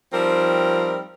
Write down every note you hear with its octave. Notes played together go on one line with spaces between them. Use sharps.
F3 G3 C4 D#4 A#4